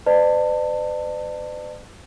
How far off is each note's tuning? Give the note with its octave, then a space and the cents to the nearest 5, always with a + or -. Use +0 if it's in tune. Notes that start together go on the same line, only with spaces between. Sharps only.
B4 +45 D5 +35 A5 +25